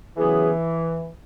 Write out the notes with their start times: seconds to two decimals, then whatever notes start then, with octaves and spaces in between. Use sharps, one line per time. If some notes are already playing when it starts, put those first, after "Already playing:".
0.17 C#3 E3 F#3 B3 E4 G#4